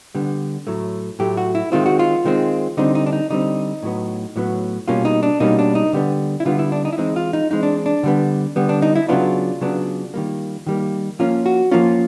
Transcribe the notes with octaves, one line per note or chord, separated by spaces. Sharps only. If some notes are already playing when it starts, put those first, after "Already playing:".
D3 G3 B3
A2 F#3 A3
A2 F#3 A3 G4
F#4
E4
D#3 G#3 C4 F4
F#4
F4
D#3 G#3 C4
D3 G3 C4 D#4
D#4
D4
D#4
D3 G3 C4 D#4
A2 F#3 B3
A2 F#3 B3
B2 G3 A#3 C#4 F4
D#4
D4
B2 G3 A#3 C#4 D#4
D4
D#4
D3 G3 B3
E4
D3 G3 B3 F4
E4
D4
D#4
E4
E3 G#3 C4 D#4
F4
D#4
E3 G#3 C4 D#4
D4
D4
D3 G3 B3
D3 G3 B3
D4
D#4
E4
C#3 F#3 B3 D4 F4
C#3 F#3 B3 D4
D#3 G3 A#3
D#3 G3 A#3
F3 A#3 C#4 F4
F#4
F3 A#3 C#4 F4